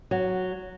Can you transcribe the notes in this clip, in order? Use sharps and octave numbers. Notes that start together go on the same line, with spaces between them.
F#3